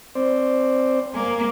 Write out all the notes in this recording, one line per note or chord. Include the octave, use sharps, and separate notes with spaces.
C4 C5 D5
A#3 G#5